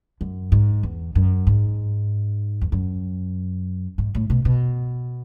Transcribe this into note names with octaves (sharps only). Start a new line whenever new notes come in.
F#2
G#2
E2
F#2
G#2
E2
F#2
G#2
A2
B2
B2